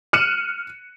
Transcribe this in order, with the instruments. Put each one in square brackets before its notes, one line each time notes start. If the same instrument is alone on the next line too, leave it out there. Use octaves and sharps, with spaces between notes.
[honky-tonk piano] F6 F#6 C#7 D#7 E7 F#7